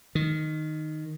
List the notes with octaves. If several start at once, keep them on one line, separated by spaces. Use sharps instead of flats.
D#3